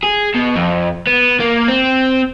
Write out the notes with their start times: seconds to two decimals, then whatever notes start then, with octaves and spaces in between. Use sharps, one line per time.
0.04 G#4
0.35 B2
0.56 F2
1.07 B3
1.40 A#3
1.68 C4